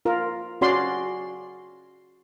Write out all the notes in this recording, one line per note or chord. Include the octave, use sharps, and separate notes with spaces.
F4 A#4
C#4 F#4 D5 C6